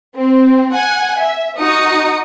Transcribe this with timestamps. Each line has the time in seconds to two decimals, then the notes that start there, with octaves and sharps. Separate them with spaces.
0.16 C4
0.73 F#5 G#5
1.19 E5
1.58 D#4 F#4 D#6 C#7